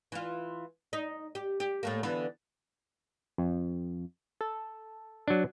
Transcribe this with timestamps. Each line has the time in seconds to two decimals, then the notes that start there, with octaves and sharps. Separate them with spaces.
0.12 E3 F4
0.93 D#4
1.35 G4
1.60 G4
1.83 A2 A3 A#3
2.03 D3 E3 B3
3.38 F2
4.41 A4
5.28 F#3 D4